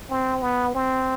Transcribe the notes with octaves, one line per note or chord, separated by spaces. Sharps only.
C4
B3
C4